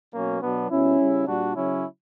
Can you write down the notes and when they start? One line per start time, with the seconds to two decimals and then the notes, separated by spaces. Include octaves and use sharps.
0.13 B2 F#3 A#3 C#4
0.41 B2 F#3 B3 D4
0.70 B2 G3 C#4 E4
0.98 C#3 G3
1.26 A#2 G3 D4 F#4
1.55 C#3 F#3 C#4 E4